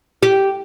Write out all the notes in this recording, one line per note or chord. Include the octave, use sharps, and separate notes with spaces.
G4